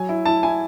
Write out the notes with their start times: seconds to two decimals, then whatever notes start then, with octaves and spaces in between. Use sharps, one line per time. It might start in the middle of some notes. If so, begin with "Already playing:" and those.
Already playing: F#3 G#5
0.09 E4
0.25 E4 A5
0.43 E4 G#5